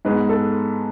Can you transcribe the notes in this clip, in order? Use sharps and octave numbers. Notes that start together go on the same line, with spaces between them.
G#2 G#3 B3 B4
A4